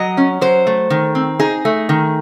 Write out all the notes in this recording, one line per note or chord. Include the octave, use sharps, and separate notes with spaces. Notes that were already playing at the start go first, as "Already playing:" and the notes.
Already playing: F#3 D#5
C#4
F#3 C5
A3
D#3
C4
D#4 G#4
A3
D#3